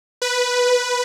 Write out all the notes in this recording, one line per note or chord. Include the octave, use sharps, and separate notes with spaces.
B4